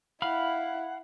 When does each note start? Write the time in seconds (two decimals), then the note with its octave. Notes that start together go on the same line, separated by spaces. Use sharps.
0.22 E4 F5 F#5 B5 F6